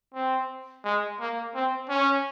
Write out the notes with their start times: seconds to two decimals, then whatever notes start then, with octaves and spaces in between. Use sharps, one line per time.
0.14 C4
0.84 G#3
1.20 A#3
1.55 C4
1.89 C#4